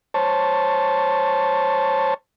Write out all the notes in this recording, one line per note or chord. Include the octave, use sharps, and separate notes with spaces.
C5 C#5 A5